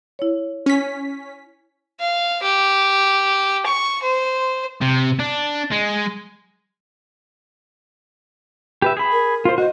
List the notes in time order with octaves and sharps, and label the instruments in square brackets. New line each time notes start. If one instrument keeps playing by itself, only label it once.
[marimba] E4 C#5
[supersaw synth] C#4 B6
[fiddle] F5
G4
C#6
C5
[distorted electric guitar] C3
D4
G#3
[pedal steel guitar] G4 B4 E5
G#4 B5
[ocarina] A#4
[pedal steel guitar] F4 C5
[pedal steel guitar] F#4 C5 [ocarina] D#5